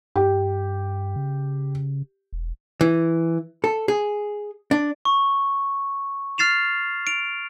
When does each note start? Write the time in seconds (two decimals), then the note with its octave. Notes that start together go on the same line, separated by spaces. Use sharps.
0.16 G2 G4
1.16 C#3
2.32 E1
2.81 E3
3.64 A4
3.88 G#4
4.71 D4
5.05 C#6
6.38 F6 A6 C7 E7 F7
7.07 D7 F7